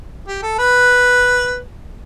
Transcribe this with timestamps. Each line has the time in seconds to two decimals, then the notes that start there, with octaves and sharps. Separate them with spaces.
0.28 G4
0.43 A4
0.58 B4